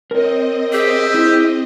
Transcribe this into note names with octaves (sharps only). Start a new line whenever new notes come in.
C4 A#4 C#5 D#5
G4 G#4 E5
E4